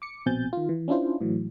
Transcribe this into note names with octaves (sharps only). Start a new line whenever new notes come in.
D6 C#7
A#1 B2 C4 G#5 G6 A6
D#3 F4
E3
C#4 D4 E4 F4 C5
A2 E3 F#3